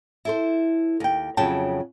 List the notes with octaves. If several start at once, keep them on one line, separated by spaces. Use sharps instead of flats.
E4 A4 C5
D#2 G5
F2 C#3 F#3 G5 A5